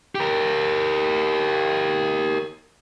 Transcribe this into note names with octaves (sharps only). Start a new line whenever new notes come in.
G4 A#4